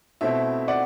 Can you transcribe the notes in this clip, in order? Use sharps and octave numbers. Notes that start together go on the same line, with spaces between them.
B2 A3 C4 E4 E5
D5 F#5